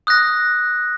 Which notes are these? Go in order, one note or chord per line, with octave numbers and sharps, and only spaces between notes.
D#6 F#6 A#6